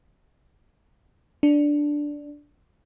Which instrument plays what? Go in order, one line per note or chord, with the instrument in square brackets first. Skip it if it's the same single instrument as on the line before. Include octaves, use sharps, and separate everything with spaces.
[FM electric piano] D4